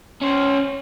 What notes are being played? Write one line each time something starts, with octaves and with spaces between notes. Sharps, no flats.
C#4 C5